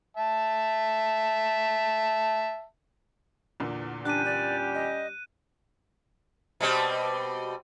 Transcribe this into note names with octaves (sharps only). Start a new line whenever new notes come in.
E5 A5
E2 A#2 D3
G3 C#4 D4 G4 F#6 D#7
D5
D#5
B2 G3 C4